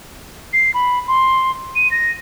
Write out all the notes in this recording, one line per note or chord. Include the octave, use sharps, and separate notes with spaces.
C7
B5
C6
D#7
A#6